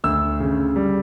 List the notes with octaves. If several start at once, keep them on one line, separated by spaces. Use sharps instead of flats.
D2 E6
C#3
G3